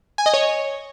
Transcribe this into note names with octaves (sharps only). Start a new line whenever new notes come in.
G#5
D#5
C#5